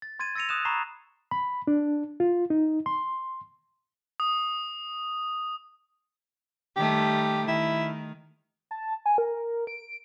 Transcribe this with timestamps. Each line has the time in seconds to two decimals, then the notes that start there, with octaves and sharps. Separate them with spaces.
0.02 A6
0.19 C6 G#6 A6 D#7
0.35 E6 A6 A#6 C#7 D#7 F7
0.49 D#6 F#6 E7
0.65 A#5 B5 C#6 C7 E7
1.31 B5
1.67 D4
2.20 F4
2.50 D#4
2.86 C6
4.20 D#6
6.77 D#3 G3 A3 G4
7.48 D#3 E4
8.71 A5
9.06 G#5
9.18 A#4
9.67 D7